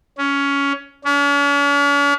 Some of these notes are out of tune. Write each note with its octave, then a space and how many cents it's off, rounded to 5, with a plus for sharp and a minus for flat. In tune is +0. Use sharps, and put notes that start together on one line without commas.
C#4 +15
C#4 +45